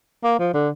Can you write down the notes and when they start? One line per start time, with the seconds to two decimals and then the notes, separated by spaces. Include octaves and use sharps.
0.24 A#3
0.39 F3
0.54 D3